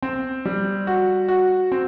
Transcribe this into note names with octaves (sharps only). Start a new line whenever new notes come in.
C4
G3
F#4
F#4
C4